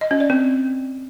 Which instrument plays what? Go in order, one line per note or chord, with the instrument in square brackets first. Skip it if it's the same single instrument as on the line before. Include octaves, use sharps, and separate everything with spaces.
[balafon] D#5
C#4
D5
C4